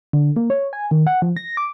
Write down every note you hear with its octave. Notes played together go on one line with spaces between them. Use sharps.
D3
A#3
C#5
G#5
D#3
F#5
F3
A#6
D6